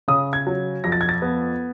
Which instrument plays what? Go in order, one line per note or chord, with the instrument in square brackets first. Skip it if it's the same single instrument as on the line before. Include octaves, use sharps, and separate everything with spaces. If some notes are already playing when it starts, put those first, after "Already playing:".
[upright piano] C#3 D#6
G#6
F#3
F2 A#6
A6
G#6
A6
B3